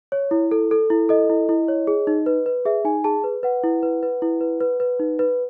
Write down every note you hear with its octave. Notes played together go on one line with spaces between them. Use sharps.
C#5
E4
A4
A4
E4
A4 D#5
E4
E4
C#5
G#4
D#4
B4
B4
G#4 E5
D#4 G#5
G#4 A5
B4
B4 F#5
E4
B4
B4
E4
B4
B4
B4
D#4
B4